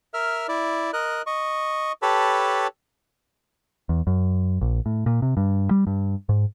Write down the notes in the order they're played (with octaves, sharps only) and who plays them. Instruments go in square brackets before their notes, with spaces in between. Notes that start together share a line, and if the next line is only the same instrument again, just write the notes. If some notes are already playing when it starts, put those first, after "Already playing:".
[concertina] A#4 E5 F6
E4 D5
A#4 D#5 F#6
D#5 C#6
G4 A4 B4 C#5 A5 B5
[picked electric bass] E2
F#2
A#1
A2
A#2
C3
G2
G3
G2
G#2